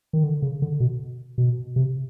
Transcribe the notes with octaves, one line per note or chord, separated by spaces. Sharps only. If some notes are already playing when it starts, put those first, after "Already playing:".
D#3
D3
C#3
D3
B2
B2
C3